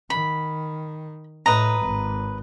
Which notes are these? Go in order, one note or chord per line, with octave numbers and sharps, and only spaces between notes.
D#3 B5
A2 B4 D#5 A#5
G#1